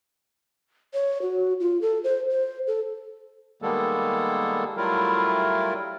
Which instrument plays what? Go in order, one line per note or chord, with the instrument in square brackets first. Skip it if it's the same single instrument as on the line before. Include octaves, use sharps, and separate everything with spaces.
[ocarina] C#5
F#4
F4
A4
C5
C5
A4
[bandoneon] D#3 G3 G#3 A#3 B3 A4
F#3 G3 A3 E4 F4 A#4